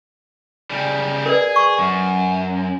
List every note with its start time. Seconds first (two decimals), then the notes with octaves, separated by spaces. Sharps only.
0.71 C#3 G3
1.26 G#4 A#4 B4 D5
1.56 C#6
1.79 F#2